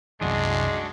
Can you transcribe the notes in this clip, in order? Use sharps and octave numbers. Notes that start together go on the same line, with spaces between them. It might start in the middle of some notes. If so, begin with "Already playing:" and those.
C2 F#2 E3 G#3 D4 F#4